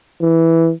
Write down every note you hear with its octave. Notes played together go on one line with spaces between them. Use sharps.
E3